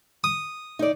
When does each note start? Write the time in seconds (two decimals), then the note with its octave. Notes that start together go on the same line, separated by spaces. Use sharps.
0.24 D#6
0.79 D#4 D5